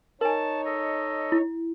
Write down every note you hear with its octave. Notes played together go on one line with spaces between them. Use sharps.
D#4 A#4 C#5 G#5 A5
A4 D#5
E4